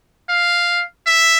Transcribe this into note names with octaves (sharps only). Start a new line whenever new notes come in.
F5
E5